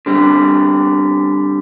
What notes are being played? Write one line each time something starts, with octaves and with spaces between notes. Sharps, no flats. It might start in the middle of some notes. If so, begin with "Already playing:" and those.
D3 G3 C4